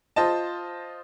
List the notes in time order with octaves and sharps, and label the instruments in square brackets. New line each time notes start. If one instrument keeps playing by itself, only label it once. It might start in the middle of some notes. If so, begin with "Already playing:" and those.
[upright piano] F4 C5 D#5 A5